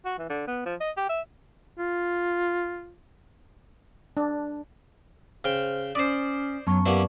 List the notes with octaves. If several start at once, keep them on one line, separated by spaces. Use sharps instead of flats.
F#4
E3
D3
B3
F3
D#5
G4
E5
F4
D4
C#3 C5 G5 F6
C#4 C5 D5 D#6
F#2 F#3 B3 A5 C#6
A#3 B3 E4 G4 B4 D5